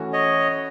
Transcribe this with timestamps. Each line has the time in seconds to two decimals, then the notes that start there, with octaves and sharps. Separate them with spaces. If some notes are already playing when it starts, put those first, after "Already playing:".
Already playing: E3 A3 C#4 F#4
0.13 C#5 D#5